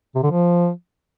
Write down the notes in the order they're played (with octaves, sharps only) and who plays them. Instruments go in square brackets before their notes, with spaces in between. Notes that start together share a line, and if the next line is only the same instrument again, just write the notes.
[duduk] C3
D3
F3